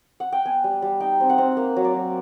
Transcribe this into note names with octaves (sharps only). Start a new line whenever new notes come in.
F#5
G5
B3 G#5
G3
G3
D#4 G5
C4
F#5
C4
A#3
F#3
D5
F#3